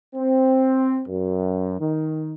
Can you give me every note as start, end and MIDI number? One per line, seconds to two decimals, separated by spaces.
0.16 1.01 60
1.09 1.78 42
1.80 2.35 51